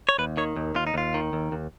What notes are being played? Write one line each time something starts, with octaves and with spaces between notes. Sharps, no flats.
C#5
D#2 B4
D#3 C#5
D#2
D#2 F4
D#4
D#2 F4
D#3
D#2
D#2